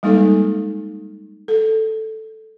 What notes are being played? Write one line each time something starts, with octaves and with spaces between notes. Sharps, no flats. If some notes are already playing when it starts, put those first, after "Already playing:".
G3 G#3 A#3 D#4 A4
A4